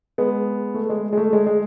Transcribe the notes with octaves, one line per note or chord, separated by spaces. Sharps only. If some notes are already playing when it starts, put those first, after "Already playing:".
G#3 B3
A3
G#3
G#3
A3
G#3
G#3